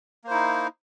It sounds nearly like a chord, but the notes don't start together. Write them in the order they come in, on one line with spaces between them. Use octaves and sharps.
A#3 C5 E4 D#4